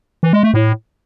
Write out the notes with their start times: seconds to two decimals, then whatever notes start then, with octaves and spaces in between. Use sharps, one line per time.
0.23 E3
0.33 G#3
0.43 A3
0.54 A2